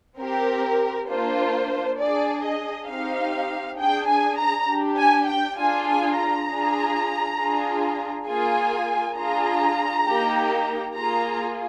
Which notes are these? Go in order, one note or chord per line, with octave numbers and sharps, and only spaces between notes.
C4 G4 A#4
A#3 D4 F4 C5
D4 G#4 D5
D#5
C4 D#4 G4 F5
D4 G#4 G5
G#5
A#5
D4 G4
G#5
G5
D4 F4 G#4 G#5
G#5
A#5
D4 F4 G#4
D4 F4 G#4
A#3 F4 G#4 G#5
D4 F4 G#4 A#5
A#3 D#4 G4
A#3 F4 G#4 A#5